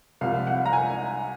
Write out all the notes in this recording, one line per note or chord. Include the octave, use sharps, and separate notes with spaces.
C2 C3 F3 F5
F#5
A#5
G#5